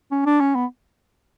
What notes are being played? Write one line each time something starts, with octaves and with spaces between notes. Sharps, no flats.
C#4
D4
C#4
B3